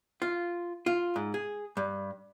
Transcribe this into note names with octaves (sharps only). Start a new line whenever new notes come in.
F4
F4
G#2
G#4
G2